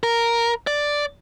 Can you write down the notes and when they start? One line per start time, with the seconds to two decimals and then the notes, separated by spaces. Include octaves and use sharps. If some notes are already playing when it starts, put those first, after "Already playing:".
0.03 A#4
0.67 D5